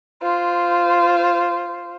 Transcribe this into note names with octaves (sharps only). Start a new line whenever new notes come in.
F4 C5